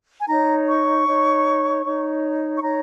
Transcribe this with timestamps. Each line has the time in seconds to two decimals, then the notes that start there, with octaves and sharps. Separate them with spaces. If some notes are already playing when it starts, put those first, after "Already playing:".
0.20 G#5
0.28 D#4 C#5 A#5
0.68 C#6
1.07 D#4 C#5
1.85 D#4 C#5
2.58 C#6
2.62 D#4 C#5 A#5